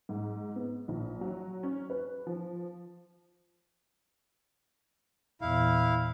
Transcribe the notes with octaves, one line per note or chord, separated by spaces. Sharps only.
G#2
B3
A#1
F#3
C#4
B4
F3
E2 A#2 E4 F5